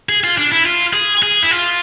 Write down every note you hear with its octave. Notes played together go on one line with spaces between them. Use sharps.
G#4
F4
D4
E4
F4
G#4
G#4
E4
F4